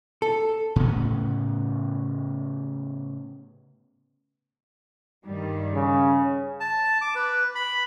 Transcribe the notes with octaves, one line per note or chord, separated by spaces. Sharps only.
A4
A2 C#3 B3
G2 D#3 G3
C#3
A5
D6
B4
B5